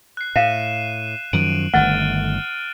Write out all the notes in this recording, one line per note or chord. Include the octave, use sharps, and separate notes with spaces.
F#6 C7
A2 E5 F5 C7 D#7 E7
F#2 D#3 F3 D7 D#7 F#7
G1 D#3 A3 F#5 F6 F#6 A6